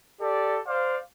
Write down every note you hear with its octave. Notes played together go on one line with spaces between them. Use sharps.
G4 A4 D5
C5 D5 F5